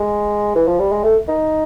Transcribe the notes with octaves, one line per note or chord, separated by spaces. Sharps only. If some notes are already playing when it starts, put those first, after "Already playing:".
Already playing: G#3
E3
F3
G3
G#3
A3
D#4